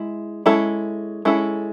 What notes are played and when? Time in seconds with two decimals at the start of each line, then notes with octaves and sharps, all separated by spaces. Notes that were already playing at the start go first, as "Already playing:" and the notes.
Already playing: G#3 E4
0.46 G#3 C#4 E4 A4
1.25 G#3 C#4 E4 A4